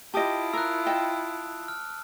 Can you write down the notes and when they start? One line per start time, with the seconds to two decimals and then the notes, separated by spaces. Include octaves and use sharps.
0.14 E4 F4 G4 D#5 A5 D#6 D7
0.53 A#4 E6 F#6
0.86 D#5 G5 A5
1.68 F6